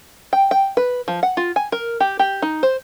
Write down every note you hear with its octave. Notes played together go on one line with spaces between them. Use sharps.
G5
G5
B4
F3
F#5
F4
G#5
A#4
G4
G4
D#4
C5